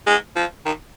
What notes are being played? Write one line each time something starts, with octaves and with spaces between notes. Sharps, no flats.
G#3
F3
D#3